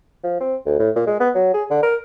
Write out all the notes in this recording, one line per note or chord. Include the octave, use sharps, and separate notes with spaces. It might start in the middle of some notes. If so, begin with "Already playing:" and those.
F3
C4
D2
A2
A#2
G#3
B3
F#3
G#4
D3
A#4